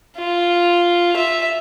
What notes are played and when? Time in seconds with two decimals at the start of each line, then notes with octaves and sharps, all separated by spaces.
0.18 F4
1.16 E5